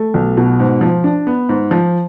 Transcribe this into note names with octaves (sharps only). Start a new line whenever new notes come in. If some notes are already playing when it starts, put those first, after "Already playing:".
Already playing: A3
B1
B2
G#2
F3
D4
B3
G#2
F3